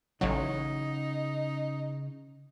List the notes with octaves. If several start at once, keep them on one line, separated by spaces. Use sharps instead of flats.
A1 C#3 F#3 D#4 E4 F#5